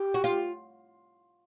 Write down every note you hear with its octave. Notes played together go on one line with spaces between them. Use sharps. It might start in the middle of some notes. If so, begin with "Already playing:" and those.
Already playing: G4
F#4
F4